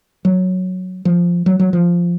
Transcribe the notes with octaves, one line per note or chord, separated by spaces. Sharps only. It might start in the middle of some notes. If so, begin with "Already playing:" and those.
F#3
F3
F#3
F#3
F3